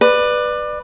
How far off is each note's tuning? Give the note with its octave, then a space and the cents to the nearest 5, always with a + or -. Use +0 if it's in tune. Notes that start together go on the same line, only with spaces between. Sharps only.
B4 +0 D5 +25